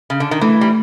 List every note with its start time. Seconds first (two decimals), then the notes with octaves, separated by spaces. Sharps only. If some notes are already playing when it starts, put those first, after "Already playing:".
0.10 C#3
0.20 D3
0.31 D#3
0.41 E3 A3
0.61 G3